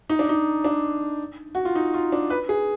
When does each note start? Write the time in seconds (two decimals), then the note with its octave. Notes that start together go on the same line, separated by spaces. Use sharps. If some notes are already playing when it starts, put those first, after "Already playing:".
0.10 D#4
0.19 D4
0.29 D#4
0.64 D4
1.55 F#4
1.65 F4
1.75 D#4
1.94 F4
2.12 D4
2.30 B4
2.49 G#4